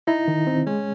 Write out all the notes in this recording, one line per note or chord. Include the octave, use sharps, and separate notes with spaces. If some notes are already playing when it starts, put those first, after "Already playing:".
D#4 E4
D#3
C4
G#3 C#4